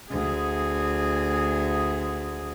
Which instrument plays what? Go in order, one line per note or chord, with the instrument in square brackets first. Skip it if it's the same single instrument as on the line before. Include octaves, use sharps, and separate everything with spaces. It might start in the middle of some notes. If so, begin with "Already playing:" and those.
[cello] D2 G#4